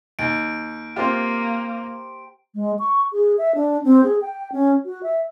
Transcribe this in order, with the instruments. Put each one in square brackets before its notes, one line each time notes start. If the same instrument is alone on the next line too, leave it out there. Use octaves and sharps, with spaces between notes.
[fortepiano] D#2 [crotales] D7
[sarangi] A#3 [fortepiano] C4 F4 [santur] G4 C5
[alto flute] G#3
C#6
G#4
E5
D4
C4
G#4
G5
C#4
F#4
E5